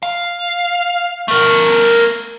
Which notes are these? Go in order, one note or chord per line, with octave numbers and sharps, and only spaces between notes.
F5
A3 A#4